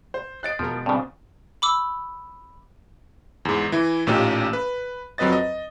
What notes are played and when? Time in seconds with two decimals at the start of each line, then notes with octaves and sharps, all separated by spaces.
0.14 C5
0.43 D#5 F#6 A6 C7 D7
0.59 E2 B2 F3 G#3 A#4
0.86 G2 C#3 C4 D4
1.62 B5 D6 E6
3.45 E2 G#2
3.72 E3 E4
4.07 A1 A#2 C#4 D#4 G4
4.53 B4
5.18 F2 F#3 C4 B4 D#5 A6
5.32 D#5